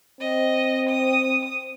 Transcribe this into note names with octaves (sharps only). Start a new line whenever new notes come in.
C4 D#5
D#6